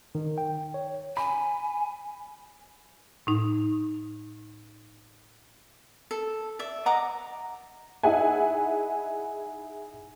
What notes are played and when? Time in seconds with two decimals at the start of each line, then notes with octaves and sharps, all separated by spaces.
0.15 D#3
0.38 G5
0.74 C#5
1.17 G#5 B5
3.27 A2 D#4
6.11 A4
6.59 D5 E5
6.86 D#5 F#5 A#5 D6
8.03 D#4 E4 G#4 E5 F#5 G#5